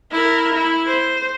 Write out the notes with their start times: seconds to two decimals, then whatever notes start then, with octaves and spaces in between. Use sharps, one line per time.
0.12 E4 A#4
0.54 E4
0.87 C5